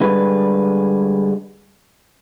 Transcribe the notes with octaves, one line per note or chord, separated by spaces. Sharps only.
D3 G3 G#3 B4